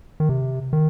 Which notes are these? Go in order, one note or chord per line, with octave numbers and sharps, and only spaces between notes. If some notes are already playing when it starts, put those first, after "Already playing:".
D#3
C3
D#3